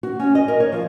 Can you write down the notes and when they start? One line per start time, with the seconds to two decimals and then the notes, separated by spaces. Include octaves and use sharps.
0.03 F#4
0.19 C#4
0.35 D#5
0.48 A#4
0.60 C#5
0.72 F3